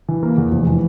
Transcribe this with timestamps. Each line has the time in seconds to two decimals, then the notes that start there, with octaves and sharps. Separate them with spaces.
0.09 E3
0.23 A#3
0.38 E2
0.51 F1
0.67 E3